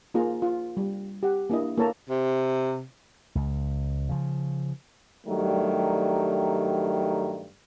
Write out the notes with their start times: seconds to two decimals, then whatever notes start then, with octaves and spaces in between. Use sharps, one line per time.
0.14 A#3 D#4 F4 G#4 A#5
0.42 F4
0.77 G3
1.23 G4 F#5
1.50 A#3 D4 E4 D#5
1.77 A#3 E4 A4 C#5 A5 A#5
2.10 C3
3.35 C#2
4.09 C#3 F3
5.27 G2 D#3 F#3 G3 A3